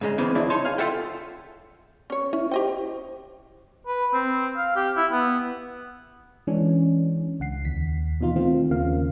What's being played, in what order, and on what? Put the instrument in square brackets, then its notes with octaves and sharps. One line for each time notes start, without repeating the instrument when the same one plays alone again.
[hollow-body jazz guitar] G#2 C#3 G#3
C#3 E3 B3 C4
F3 F#3 D4 E4
D#4 C#5 A5 C6
G#4 F5
F4 A4 E5 F#5 G5
[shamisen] C#4 C#5
[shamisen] C#4 [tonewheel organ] E4
[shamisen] G4 D#5 G5 [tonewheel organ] C5
[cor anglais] B4
C4
F5
G4
E4
B3
[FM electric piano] E3 G#3 C#4 D4
C#2 F#5 C7
D#2 B6
B2 E3 D#4 F4
D#3 A3 C4 F4
D#2 C#3 A#3 F5